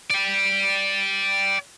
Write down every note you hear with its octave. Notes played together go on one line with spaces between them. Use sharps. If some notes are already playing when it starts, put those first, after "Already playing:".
D5 G5